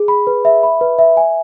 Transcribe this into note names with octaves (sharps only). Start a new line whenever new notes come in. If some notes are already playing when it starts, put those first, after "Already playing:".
Already playing: G#4
B5
B4
E5
B5
B4
E5
G#5